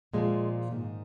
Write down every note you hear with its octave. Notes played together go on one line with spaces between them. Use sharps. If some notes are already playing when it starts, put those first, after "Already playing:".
A#2 F3 G#3
G#2 D#3